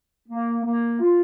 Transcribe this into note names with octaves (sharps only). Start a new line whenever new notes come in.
A#3
A#3
F4